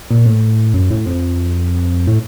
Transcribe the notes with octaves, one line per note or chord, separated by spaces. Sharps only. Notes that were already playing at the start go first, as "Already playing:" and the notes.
A#2
A2
F#2
A2
F2
A2